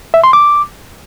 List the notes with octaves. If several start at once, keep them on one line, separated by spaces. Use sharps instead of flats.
E5
C6
D6